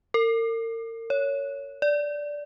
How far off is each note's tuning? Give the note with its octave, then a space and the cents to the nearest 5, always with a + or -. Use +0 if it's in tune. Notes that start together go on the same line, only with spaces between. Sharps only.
A#4 -40
C#5 +10
D5 -5